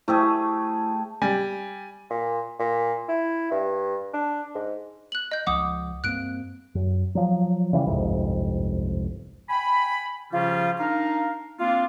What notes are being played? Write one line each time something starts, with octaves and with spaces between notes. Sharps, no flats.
A3 E4 G4 G#4 C5 E6
G3 G#5
A#2
A#2
E4
G2
D4
G#2
F#6 F#7
D#5 G6
C#2 F3 F#5 D6 D#6
G2 A#3 C4 F#6 D7
F#2
F3 F#3
C#3 E3 F#3 G3
G1 C2 F2 G#2
G5 G#5 B5
C#3 F3 G3 C#4 F4
D4 D#4 A#4 F5
A#3 C4 D4 F4